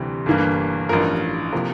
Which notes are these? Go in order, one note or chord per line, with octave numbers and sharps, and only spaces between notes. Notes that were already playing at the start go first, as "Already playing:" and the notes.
Already playing: D2 C3 E3 G3
G1 G2 E3 A#3
A1 G2 F3 A#4
C3 F3 A#3